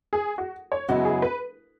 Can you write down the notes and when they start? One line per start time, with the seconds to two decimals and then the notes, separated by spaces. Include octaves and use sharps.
0.13 G#4
0.38 F#4
0.72 C#5
0.89 F#2 C#3 G#3 B3 E4 F#4
1.05 G#4
1.22 B4